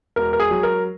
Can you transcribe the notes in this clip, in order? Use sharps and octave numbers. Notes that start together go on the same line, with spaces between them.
E1 A#4
A#4
G#4
F#3
A#4